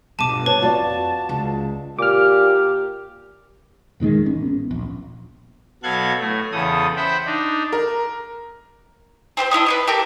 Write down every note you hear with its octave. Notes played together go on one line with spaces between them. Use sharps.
G1 B2 A5 D6 D#7
B4 C#5 A5
F2 F4 F#4 D5 A5
C#2
A#2 G4 D6 F6
E1 A#2 D#3 G#3
A1 C#4
B3
D#1 A#1
B2 F#3 A4 F5 F#6 G#6
A2 A3
E2 C#3 A4 D#6
C5 E5 F#5 G5 B5
D4 D#4
A#4
C4 G4 A4 C5
D4 E4 C#5 D#6
B4 C#5 D#5
G4 A4 A#4